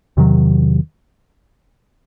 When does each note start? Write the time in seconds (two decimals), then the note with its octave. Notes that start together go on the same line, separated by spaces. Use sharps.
0.17 E2 C3 D#3 F#3